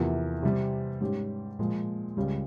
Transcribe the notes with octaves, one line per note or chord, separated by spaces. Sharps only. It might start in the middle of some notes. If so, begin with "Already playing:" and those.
Already playing: E2 C3 F3 A#3 E4
C3 G3 C4
G#2 G3 C#4 G4
A#2 F3 G#3
C#2 C#3 G3